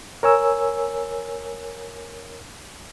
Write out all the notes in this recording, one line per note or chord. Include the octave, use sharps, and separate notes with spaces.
A#4 C#5 G#5 E6